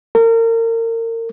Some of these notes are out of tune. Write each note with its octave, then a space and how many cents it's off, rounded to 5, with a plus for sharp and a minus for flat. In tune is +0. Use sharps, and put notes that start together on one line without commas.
A#4 -35